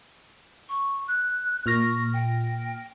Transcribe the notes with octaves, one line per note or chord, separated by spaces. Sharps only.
C#6
F#6
A#2 C#6 F6 A#6
G5